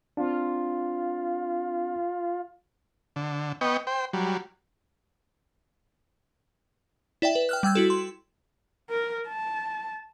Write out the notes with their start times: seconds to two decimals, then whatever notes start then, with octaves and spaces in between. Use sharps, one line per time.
0.17 C4 D4 F4
3.16 D3
3.61 B3 D#5 G5 C#6
3.87 C5 G5
4.13 F#3 G3
7.22 E4 D5 E5 G5
7.35 B4
7.49 G5 F6 F#6
7.63 G3 G5 E6 G#6
7.75 E4 F#4 A4
7.90 C6
8.90 A#4
9.28 A5